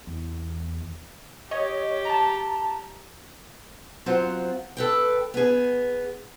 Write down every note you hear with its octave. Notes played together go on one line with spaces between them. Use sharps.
E2
G4 C#5 D#5
A5 A#5
F#3 C4 F4 C5 F#5
A4 B4 G5
B3 G#4